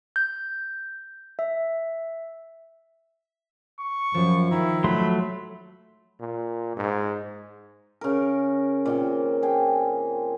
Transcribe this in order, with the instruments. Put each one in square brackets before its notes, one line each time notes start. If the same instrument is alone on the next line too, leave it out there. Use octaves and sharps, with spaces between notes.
[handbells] G6
E5
[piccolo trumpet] C#6
[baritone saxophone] F#2 [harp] F3
[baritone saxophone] D#3 [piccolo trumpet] E4
[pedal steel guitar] F#3 A3 C6 [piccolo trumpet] B5
[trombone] A#2
G#2
[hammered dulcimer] C#3 A#4
A#2 D#3 C4
G#4 G5